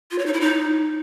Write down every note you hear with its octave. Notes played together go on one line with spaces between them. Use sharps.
F4
C#5
D#4
E4
D#4